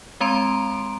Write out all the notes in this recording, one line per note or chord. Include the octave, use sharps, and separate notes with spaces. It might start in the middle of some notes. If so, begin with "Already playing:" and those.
G#3 C4 A#5 C6 D7